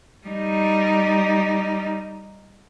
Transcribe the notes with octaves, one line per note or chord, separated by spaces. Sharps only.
G3 D#4